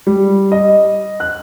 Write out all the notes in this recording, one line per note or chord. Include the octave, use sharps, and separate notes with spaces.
G3
D#5
F#6